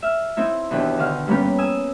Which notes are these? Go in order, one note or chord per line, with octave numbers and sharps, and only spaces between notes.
E5 F6
C4 D#4 E4
D#2 B2 E3 D4 G5
D3 D#3 F5
G2 G3 A#3 B3 C#4 G4
G#5 D#6 E6